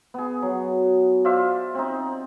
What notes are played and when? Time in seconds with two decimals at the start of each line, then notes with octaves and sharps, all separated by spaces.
0.14 B3 G#4
0.42 F#3
1.25 F4 C5 D5 E5
1.75 C4 D#4